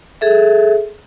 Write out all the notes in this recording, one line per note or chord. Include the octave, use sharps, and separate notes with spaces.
G#4 A4 E5